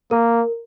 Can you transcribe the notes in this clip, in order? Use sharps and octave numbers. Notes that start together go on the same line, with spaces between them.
A#3 A#4